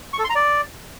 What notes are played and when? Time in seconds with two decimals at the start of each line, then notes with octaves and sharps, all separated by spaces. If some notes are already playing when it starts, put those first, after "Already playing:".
0.13 C#6
0.19 A4
0.24 C6
0.30 A#5
0.35 D5